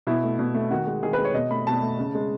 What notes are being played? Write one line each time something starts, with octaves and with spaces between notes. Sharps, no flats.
B2 E4
A3
B2
A3
D#3 F#4
G#3
D#3 G#4
B4
G#3
C#5
B2 D#5
A3 B5
B2 A5
A3
C#3
G#3